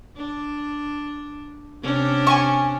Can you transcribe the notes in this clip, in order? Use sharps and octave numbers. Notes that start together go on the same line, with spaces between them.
D4
C3 C#4 D4
G#5 A5 C#6